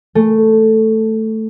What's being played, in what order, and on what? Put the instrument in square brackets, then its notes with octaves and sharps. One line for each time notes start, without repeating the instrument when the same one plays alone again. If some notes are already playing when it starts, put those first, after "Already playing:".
[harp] A3